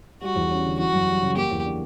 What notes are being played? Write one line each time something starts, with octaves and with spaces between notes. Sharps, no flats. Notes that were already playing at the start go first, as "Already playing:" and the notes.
G3 F#4
E2
C#4
D3
E3 F#4
F#2
G3
C#3
A#3 G4
E2
D4